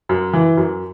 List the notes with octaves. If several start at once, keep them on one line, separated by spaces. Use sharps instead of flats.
F#2
E3
F#2